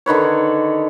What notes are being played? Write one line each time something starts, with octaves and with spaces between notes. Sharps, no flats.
D3 D#3 B4 C#5